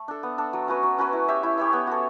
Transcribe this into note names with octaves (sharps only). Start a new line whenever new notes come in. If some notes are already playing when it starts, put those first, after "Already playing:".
Already playing: A3
D4 A4
B3
D4 A4
F#3
C#4 F#4 B4
F#3
C#4 F#4 B4
E4
G4 C#5 E5
E4
G4 C#5 E5
B3
F#4 A4